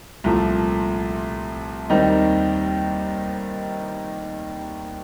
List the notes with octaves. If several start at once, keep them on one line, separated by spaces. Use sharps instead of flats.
C2 A#2 F3 A3
D#2 D#3 G3 C4 D#4